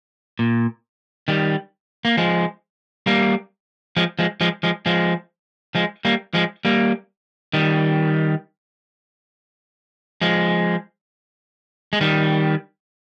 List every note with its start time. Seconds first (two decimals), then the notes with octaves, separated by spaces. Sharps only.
0.39 A#2
1.28 D#3 G3
2.05 A#3
2.17 F3 G#3
3.07 G3 A#3
3.97 F3 G#3
4.19 F3 G#3
4.41 F3 G#3
4.63 F3 G#3
4.86 F3 G#3
5.75 F3 G#3
6.05 G3 A#3
6.34 F3 G#3
6.65 G3 A#3
7.53 D#3 G3
10.22 F3 G#3
11.93 G#3
12.01 D#3 G3